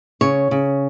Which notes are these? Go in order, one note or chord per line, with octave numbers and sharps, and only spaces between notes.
C#3 C#5
C#3